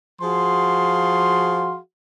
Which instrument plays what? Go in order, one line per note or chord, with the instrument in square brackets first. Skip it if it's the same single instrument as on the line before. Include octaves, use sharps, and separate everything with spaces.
[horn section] F3 F#4 G#4 F5 C6